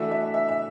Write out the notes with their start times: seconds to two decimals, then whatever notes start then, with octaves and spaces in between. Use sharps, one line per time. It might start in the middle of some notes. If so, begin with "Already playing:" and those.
Already playing: E3 A3 D4 F#4 A4 E5
0.11 E5
0.34 E5
0.48 E5